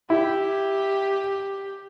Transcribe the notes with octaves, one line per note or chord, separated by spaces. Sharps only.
E4 G4